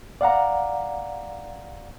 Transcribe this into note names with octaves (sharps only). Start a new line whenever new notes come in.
D5 F5 F#5 A#5